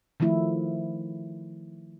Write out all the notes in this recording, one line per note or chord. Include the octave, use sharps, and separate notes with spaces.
D#3 F3 A3 E4